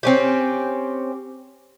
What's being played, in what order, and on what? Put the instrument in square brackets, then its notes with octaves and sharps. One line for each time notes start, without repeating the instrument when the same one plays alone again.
[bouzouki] C4 C#4 G4